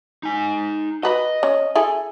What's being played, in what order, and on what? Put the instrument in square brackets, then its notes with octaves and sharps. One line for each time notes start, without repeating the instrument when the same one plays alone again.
[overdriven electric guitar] D#4 G#5
[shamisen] F#4 B4 B5 [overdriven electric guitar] D#5
[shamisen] C#4
E4 G#4 A4